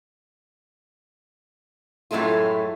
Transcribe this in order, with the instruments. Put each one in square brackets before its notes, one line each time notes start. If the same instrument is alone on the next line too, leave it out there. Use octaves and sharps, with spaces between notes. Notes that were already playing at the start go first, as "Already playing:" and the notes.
[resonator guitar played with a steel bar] F#2 A2 G#3 A3 F4